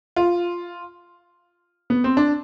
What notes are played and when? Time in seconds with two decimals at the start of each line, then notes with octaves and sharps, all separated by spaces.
0.16 F4
1.90 B3
2.04 C4
2.17 D4